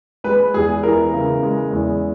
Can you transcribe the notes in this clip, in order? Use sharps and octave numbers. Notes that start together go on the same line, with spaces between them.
G#3 B4
E2 G#4
E3 A#4
C#3
G#3
E2